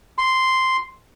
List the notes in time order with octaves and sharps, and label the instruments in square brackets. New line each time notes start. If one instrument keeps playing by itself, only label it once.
[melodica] C6